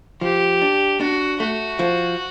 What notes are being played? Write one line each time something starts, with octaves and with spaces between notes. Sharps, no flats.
F3 G4
D4
D4 F#4
A3 F#4
F3